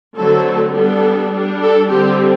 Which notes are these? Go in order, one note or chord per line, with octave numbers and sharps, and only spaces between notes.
D3 F#3 A3 C4 A4
G3 B3 D4 A4
G3 D4
A4
D3 G3 C4 G4